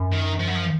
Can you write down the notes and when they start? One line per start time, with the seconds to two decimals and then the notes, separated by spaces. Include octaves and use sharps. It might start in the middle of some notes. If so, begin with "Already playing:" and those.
Already playing: F#2
0.12 D#3
0.39 F3
0.48 F#3
0.55 F3